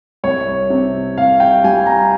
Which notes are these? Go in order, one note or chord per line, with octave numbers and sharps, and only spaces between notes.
C2 C#5
C3
C2 F5
G5
G3 G#5
A#5